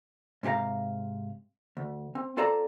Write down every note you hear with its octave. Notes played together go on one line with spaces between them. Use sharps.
G#2 C3 G4 F5 A#5
D2
C4
C4 F4 A4 D5 A5 A#5